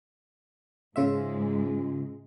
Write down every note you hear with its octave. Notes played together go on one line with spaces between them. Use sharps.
G#2 C#3 G#3 F4 E5